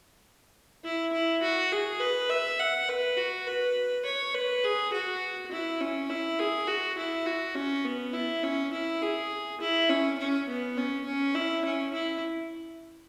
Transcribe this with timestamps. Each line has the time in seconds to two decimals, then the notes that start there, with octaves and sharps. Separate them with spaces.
0.84 E4
1.12 E4
1.42 F#4
1.72 G#4
2.00 B4
2.30 E5
2.59 F#5
2.89 B4
3.17 F#4
3.47 B4
4.05 C#5
4.34 B4
4.63 G#4
4.92 F#4
5.51 E4
5.80 C#4
6.09 E4
6.39 G#4
6.67 F#4
6.98 E4
7.26 F#4
7.55 C#4
7.84 B3
8.13 E4
8.43 C#4
8.73 E4
9.02 G#4
9.60 E4
9.89 C#4
10.18 C#4
10.48 B3
10.77 C#4
11.06 C#4
11.35 E4
11.65 C#4
11.93 E4